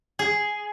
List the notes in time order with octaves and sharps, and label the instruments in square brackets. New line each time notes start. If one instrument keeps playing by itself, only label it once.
[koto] G#4